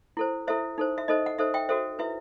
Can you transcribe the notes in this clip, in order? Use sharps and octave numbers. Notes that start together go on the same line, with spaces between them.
E4 A4 C5
E4 A4 C5 E5
D#4 A4 C5
E5
D#4 A4 C5 D#5
F#5
D#4 A4 C5 E5
E5 G5
F#4 A4 C5 E5
E4 B4 E5